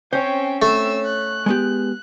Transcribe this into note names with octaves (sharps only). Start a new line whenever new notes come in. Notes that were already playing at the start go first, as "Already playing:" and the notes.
C4 C#4 C5 C#5 G5
A3 C4 E6
F#6
G#3 B3 G4